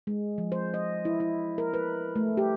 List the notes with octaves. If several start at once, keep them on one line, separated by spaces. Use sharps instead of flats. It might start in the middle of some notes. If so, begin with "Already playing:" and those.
G#3
F3
C5
D#5
E4
E4
A#4
B4
A3
G4